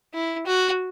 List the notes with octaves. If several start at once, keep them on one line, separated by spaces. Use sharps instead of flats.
E4
F#4